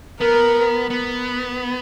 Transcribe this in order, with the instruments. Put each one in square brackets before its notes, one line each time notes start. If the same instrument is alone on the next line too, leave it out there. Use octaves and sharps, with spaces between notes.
[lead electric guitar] B3 [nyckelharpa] A#4
[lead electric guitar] B3